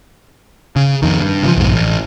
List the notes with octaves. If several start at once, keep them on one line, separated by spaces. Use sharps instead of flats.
C#3
F2 D#3
G2
C#3 E3 F3
B1 F2 G#2
A1